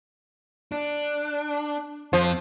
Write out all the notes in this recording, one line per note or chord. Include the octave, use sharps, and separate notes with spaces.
D4
F2 F3